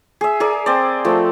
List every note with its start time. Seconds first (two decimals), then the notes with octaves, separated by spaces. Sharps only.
0.21 G#4 E5
0.40 G#4 A#4 D5
0.66 C4 D5
1.05 F3 A3